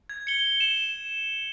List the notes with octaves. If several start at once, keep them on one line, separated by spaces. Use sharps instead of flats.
G#6
C#7 G7
E7